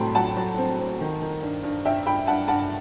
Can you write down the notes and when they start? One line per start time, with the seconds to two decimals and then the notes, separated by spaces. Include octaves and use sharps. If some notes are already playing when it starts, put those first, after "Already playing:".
Already playing: A2 F#3 C4 G5 A5 B5 C6
0.15 F#3 F#5 A5
0.37 F#3
0.58 C4
0.78 C4
1.01 D#3
1.22 D#3
1.42 G2
1.63 G2
1.85 G2 E5 G5
2.06 G2 G5 B5
2.27 G2 F#5 A5
2.48 G2 F#5 A5